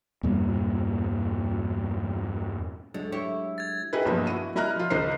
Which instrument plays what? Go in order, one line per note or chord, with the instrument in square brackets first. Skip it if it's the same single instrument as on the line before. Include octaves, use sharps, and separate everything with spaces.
[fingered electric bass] E2 G2 A#2 G3
[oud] D2 D3 [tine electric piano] F#3 G#3 D4
[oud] E4 G4 C#5
[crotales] G#6 A6
[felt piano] D#4 E4 G4 G#4 B4
B1 G2 F3 F#3 A#3
E4 F#4 D#7
G3 E4 D#5 A#5 F6 F#6
F3 F4
C#2 D#3 D#4 C5 C7